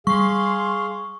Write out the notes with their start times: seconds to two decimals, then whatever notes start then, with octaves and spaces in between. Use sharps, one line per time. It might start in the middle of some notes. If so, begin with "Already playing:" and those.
0.07 G3 G#4 F5 C6 C#6